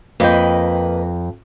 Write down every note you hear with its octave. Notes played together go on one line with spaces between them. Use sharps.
F2 A#3 B4 D#5 G5